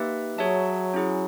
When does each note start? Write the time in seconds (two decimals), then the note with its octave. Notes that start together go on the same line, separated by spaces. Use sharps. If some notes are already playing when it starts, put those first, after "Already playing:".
Already playing: A#3 D#4 G4 B4 E5
0.38 F#3 G#4 C#5 E5 A5
0.94 C#4 E4 G#4